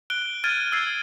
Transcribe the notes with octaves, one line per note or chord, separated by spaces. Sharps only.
F#6 D7 G7
F6 G#6 A6 D7 D#7
E6 G#6 A6 C7